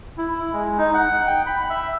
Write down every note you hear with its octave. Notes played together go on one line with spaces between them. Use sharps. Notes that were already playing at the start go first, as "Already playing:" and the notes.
E4
G#3
D#4
F#5
G5
B5
E5